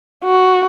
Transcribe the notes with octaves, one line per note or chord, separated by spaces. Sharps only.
F#4